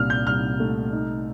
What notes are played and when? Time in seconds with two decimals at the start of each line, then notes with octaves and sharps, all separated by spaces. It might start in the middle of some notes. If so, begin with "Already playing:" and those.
Already playing: C2 A#2 F6
0.10 G6
0.26 C2 F6
0.60 A3
0.93 D#4